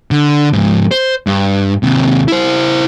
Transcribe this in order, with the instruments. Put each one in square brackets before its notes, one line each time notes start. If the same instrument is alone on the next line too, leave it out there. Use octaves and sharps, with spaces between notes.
[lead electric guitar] D3
G#2 F3
C5
G2
D#2 C3
E4 C5